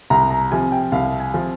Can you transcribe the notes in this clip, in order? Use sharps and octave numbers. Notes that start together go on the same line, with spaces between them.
C2 A#5
A#5
C3 F3 G#5
G5
C2 F5
G#5
C3 F3